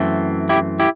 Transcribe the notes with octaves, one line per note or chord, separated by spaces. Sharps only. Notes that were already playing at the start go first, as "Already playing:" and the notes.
Already playing: F#2 E3 A3 C4
E4 G4
E4 G4